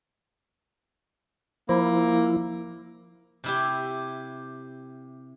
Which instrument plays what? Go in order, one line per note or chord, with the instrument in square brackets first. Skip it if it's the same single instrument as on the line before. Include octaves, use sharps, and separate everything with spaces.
[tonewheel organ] F3 E4 [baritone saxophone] A#3
[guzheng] C3 E4 G4